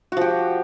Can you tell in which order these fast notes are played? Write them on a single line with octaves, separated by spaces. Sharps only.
F#4 F3 G4